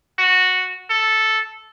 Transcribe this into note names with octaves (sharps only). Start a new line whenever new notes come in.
F#4
A4